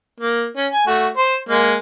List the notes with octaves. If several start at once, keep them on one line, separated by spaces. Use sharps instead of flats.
A#3
C#4
G#5
A3 F#4
C5
G#3 A#3